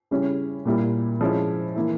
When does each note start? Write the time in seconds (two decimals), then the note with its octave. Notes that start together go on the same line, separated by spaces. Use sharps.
0.11 C#3 G3 C#4 E4
0.65 A#2 G3 A#3 E4
1.21 F3 G#3 C#4 E4
1.76 E3 A#3 E4